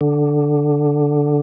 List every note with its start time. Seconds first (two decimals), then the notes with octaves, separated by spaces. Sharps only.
0.01 D3